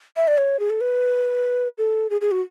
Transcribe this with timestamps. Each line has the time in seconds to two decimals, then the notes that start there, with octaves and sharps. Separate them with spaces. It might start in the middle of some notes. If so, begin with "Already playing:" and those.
0.17 E5
0.28 D5
0.38 C#5
0.59 G#4
0.70 A4
0.81 B4
1.78 A4
2.10 G#4
2.21 G#4
2.31 F#4